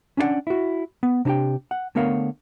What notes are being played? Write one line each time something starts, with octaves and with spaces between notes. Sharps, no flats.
C#4 D4 E4 D5 F#5
E4 F#4
B3
C3 D4 D#4 G4 G5
F#5
D3 A3 B3 A#4 C#5 F5